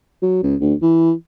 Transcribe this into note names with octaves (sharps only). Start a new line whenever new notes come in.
F#3
C#2
D2
E3